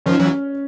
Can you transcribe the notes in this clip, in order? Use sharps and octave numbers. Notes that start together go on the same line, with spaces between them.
D#3 F3 C#4
E3 F#3